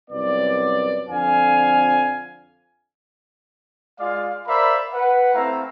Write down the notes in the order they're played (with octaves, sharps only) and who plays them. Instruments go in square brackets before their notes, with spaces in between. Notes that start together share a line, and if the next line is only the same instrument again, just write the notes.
[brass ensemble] C2 F#2 B3 D5
F2 D3 F3 F5 G#5
[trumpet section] G#3 F4 D5 F5
A#4 C5 D5 E5 F5 B5
B4 F#5
A3 C4 E4 E5 F5 A#5